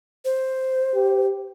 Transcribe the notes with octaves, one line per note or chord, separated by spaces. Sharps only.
C5
G4